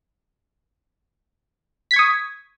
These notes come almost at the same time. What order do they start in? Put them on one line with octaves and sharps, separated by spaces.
B6 G#6 C#6 D#6